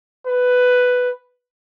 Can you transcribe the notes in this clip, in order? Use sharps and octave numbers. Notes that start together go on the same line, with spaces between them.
B4